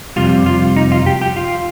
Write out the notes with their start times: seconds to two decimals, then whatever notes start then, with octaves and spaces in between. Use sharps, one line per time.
0.16 F2 C3 G3 F4
0.46 F4
0.76 D#4
0.92 F4
1.06 G4
1.22 G4
1.37 F4